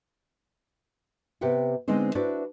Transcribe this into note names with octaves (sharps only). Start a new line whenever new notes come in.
C3 B3 G4 B4 F#5 G5
D3 G#3 B3 C4 D#4 C5
D4 E4 F#4 B4 C5 D5